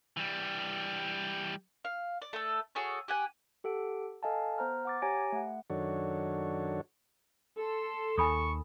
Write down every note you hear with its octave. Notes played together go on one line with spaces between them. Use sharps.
E3 G3
F5
D5
A3 A4
F#4 G#4 A4 C#5
G4 F#5 G#5
G4 A4 F#5 D7
A4 D#5 F5 G#5 A5
B3 C5 A#5 F6
F#5 D6 A6
G4 C#5 G#5 A#5 A#6 D7
A3 F#5
F#2 D#3 D4 F#4 A4 C#5
A4 C6
D#2 G#5 B5 C#6 D#6